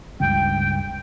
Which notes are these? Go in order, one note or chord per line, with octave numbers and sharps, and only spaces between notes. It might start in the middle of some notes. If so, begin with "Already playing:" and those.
C#2 G2 G5